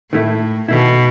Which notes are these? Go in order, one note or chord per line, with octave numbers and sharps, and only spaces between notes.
A2 D#3 A3 E4
B2 D#3 A3 E4